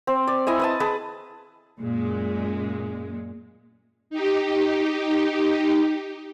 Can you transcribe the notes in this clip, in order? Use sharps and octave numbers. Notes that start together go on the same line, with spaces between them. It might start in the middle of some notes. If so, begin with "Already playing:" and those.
C4
D5
E4 D#5 E5 G#5
B4 D#5 A5
G#4 B4 A5
F#2 A#2 G#3
D#4 G4